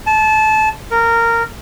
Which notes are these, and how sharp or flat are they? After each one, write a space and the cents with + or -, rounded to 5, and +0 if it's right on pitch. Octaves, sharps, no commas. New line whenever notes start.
A5 -25
A#4 -15